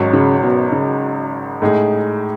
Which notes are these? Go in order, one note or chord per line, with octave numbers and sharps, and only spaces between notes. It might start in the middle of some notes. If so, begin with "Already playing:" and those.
Already playing: G#1 G#2 F#3 C#4
C#3
B2
C#3
A2 G#3 D#4 G#4